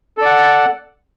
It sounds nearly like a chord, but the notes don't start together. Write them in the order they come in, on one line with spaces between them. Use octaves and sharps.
A4 D5 F#5